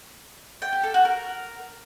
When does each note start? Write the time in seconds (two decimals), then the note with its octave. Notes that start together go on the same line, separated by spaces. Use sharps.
0.62 G5
0.73 G4
0.83 A4
0.94 F#4
1.05 A#4